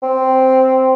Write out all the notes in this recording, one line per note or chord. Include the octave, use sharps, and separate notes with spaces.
C4